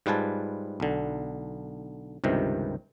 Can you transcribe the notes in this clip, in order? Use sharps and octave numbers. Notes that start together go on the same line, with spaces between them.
G#2 G3 F4 B4 G#5 A5
B1 D3
C#2 G2 C3 D#3